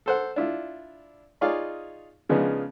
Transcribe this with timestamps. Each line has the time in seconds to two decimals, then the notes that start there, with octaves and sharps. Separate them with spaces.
0.06 A4 C5 F#5
0.36 D4 E4 F4
1.41 D#4 F4 G#4 C#5 D5 F5
2.29 C#3 F3 G#3 B3 D4 D#4